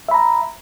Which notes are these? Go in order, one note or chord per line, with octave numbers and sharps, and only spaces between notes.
E5 A#5 B5